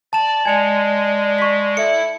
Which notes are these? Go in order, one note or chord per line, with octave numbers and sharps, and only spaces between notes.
D5 A5 E7
G#3 D5 G#5 G#6 C#7 F7
C#6 A#6 B6
E4 A4 E5 C#7